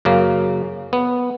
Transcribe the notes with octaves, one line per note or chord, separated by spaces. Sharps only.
F#2 C#3 A#3
B3